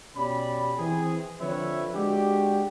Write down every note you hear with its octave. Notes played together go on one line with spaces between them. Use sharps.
B2 C#4 G4 D5 B5
E3 C4 G#4
D3 F3 C4 B4 C#5 E5
G#3 D4 F#4 G4